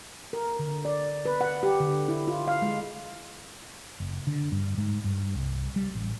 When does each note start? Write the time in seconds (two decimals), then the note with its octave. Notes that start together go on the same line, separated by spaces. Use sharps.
0.33 A#4
0.59 D3
0.85 D5
1.25 B4
1.41 F#5
1.63 G4
1.80 D3
2.08 E4
2.28 F4
2.48 F5
2.62 G#3
4.00 F#1
4.27 D3
4.52 G2
4.77 G#2
5.04 G2
5.35 C2
5.76 G3
5.95 A1